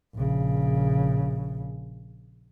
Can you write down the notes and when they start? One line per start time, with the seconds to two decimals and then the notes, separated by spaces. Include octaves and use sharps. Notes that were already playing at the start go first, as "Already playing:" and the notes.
0.15 A#1 C#3